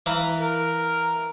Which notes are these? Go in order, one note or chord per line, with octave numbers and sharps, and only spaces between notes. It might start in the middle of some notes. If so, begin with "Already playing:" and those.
E3 F5 A#5
A#4